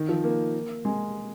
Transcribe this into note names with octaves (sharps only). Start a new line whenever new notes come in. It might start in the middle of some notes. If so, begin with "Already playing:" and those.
Already playing: D#3
F3
A#3
G#3